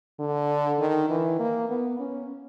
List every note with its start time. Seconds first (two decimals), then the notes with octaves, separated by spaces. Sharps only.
0.19 D3
0.79 D#3
1.09 E3
1.39 A#3
1.70 B3
1.99 C#4